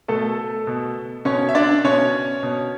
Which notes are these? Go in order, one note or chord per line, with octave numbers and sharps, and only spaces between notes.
B2 A3 A4
B2
B2 C#4 C#5
E5
D4 D5
B2 C#4 C#5
B2